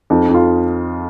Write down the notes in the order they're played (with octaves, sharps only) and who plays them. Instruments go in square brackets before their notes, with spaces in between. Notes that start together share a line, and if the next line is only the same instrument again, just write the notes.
[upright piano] F2 D#4
F2
F4